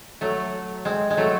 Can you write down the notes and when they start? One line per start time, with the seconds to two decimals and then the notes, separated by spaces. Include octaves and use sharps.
0.21 F#3 A3
0.85 G#3 C4
1.10 G#3
1.17 F#3 A3